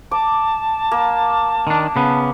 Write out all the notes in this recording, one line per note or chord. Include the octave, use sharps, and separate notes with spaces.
A5 D6
A#3
D#3 D4
C#3 B3